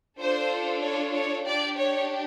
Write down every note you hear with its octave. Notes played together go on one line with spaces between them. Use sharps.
D4 F4 A4 C5
C#5
C#5
D4 G4 D5
C#5